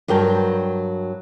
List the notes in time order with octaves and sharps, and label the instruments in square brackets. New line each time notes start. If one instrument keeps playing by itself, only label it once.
[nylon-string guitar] G2 F#3 A#4 G5 A5